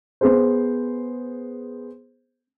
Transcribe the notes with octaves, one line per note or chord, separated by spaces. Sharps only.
B3 G#4 C5